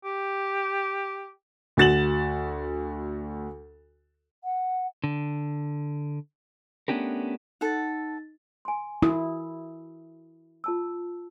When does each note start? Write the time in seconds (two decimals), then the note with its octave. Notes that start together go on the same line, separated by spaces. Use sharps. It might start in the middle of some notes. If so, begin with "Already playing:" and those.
0.05 G4
1.77 D2 F#4 A6 E7 F#7
4.44 F#5
5.04 D3
6.88 A3 B3 C#4 D4 G4 A#4
7.61 D#4 A4 F#5 A6
8.65 G#5 C6
9.02 E4 F#4 A#4 D#6
10.64 F4 A5 E6